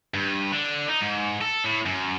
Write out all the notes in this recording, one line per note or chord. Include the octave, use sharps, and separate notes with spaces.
G2
D3
D#4
G#2
A4
A2
F#2